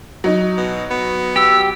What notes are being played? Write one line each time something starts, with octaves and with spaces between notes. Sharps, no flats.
F#3 D#4
B2
B3
G4 E6